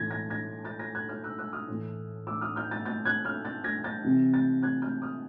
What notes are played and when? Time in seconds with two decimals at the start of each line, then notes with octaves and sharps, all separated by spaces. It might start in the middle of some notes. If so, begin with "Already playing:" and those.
Already playing: A2 E3 G#6 A#6
0.11 G#6 A#6
0.30 G#6 A#6
0.65 G6 A6
0.79 G#6 A#6
0.95 F#6 G#6
1.09 F6 G6
1.24 E6 F#6
1.38 E6 F#6
1.53 D#6 F6
1.68 A2 E3
2.27 D6 E6
2.41 D#6 F6
2.56 F6 G6
2.71 G6 A6
2.86 G6 A6
3.05 F#6 G#6
3.25 F6 G6
3.45 G6 A6
3.64 G#6 A#6
3.84 G6 A6
4.04 C3 E3
4.34 G6 A6
4.63 F#6 G#6
4.82 F6 G6
5.02 D#6 F6